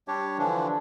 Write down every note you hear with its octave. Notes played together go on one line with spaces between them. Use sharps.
G3 D4 G4 C#5
D3 E3 F3 D4